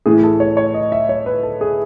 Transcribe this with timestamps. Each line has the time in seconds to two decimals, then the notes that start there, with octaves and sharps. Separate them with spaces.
0.06 A2 E3 G#4
0.23 A4
0.40 C#5
0.57 C#5
0.74 D#5
0.92 E5
1.09 C#5
1.26 B4
1.43 A4
1.61 G#4